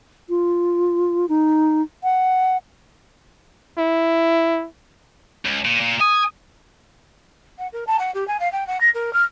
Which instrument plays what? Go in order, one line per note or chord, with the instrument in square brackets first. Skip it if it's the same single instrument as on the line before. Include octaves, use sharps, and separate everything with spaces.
[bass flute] F4
D#4
F#5
[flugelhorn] E4
[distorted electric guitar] C#2
A#2
A#2
[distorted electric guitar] G#5 [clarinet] D#6
[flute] F#5
A#4
A5
F#5
G4
G#5
F5
G5
F#5
A#6
A#4
F6